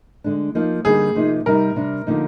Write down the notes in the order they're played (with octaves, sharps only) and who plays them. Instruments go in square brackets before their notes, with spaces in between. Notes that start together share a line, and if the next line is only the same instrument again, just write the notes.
[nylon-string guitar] D3 G#3 D4
F3 A#3 D#4
[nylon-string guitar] D3 G3 A#3 D#4 [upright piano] G#4
[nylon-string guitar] C3 F3 A#3 D#4
[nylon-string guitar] C3 G3 C4 D#4 [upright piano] A#4
[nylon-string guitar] C3 G3 D4
D3 F3 A#3 D#4